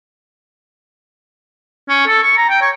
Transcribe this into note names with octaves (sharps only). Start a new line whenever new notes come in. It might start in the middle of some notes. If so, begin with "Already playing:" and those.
C#4
A4
C#6
A#5
G5
C#5